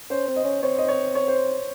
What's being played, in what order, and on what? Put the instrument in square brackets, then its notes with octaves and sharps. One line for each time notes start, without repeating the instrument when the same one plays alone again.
[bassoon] C#4 [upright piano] C5
[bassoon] C4
[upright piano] D#5
[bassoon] C#4
[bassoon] C4 [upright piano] C#5
[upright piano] D#5
C#5
C#5
C5